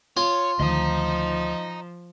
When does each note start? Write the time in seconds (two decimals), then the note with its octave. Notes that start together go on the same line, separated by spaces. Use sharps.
0.17 F4 C#5
0.60 D2 D#3 F3 D#5 A#5